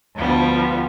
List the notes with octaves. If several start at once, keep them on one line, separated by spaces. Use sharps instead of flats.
D2 F3 G3 B3